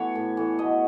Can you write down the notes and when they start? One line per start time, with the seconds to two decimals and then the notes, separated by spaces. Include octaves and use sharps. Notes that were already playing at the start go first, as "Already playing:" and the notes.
Already playing: E3 A3 B3 F#4 C#5
0.15 A2
0.37 E3 A3
0.59 B2 D#5